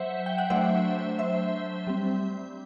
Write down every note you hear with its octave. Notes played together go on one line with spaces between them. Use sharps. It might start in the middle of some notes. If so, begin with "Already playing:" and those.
Already playing: F#3 C5 E5 F#5
G5
F#5
F#3 A3 D4 C5 E5
C5 E5
G3 C4